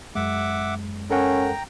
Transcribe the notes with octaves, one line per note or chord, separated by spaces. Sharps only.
F#2 G#3 E5 F#5 D6
C#4 A4 A#4 F#5 G5 A#5